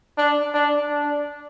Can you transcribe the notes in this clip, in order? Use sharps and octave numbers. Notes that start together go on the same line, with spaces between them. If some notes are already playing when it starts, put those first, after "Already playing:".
D4
D4
D4